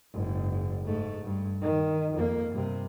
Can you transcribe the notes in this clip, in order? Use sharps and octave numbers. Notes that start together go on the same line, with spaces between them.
F#1 G#2
G#2 A3
G2
D#3
F2 A#3
G2 C3